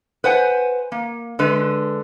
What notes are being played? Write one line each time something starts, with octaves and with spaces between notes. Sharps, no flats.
B4 C5 F#5 G#5
A#3
D3 G#3 B4